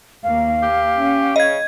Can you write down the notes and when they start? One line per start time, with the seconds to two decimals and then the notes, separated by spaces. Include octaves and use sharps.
0.23 D#2 A#3 F5
0.62 G4
0.98 C#4
1.36 C#3 D#5 G#6